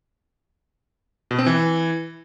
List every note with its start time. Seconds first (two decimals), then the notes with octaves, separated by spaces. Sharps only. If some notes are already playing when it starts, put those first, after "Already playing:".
1.31 B2
1.39 C4
1.46 E3